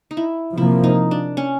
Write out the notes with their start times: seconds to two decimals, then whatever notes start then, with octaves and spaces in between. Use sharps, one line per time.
0.11 D#4
0.17 E4
0.58 C3 F3 A#3 E4
0.84 D#4
1.11 D4
1.37 C#4